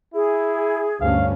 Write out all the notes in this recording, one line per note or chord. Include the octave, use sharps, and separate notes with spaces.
E4 G#4
D2 G2 C#4 F5